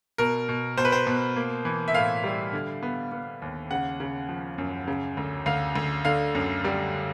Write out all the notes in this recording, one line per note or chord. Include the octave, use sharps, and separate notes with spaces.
B2 A#4
B2
B2 C5
B4
C5
B2
A#3
E3
E5
A2 F5
G3
D3
B3
B3
D#2
C#3 F#5
C#3
F3
F#2
C#3
D2
D2 F5
D2
D3 F5
F#2
G3